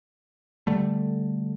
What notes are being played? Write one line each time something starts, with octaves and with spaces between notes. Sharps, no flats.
D3 G3 A3